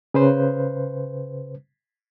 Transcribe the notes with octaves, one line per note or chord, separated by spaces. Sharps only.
C#3 B4 C5